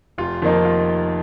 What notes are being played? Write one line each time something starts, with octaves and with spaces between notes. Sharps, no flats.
F1 F4
F2 D#3 A#3 D#4
F4